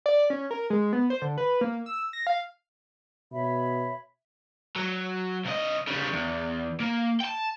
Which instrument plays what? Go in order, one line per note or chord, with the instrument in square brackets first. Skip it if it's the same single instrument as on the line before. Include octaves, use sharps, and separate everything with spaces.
[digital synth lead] D5
C#4
A#4
G#3
B3
C5
D3
B4
A#3
E6
A#6
F5
[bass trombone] B2 [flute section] C#5 E5 B5
[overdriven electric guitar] F#3
C2 D#5
C#3 G3
E2
A#3
G5 A5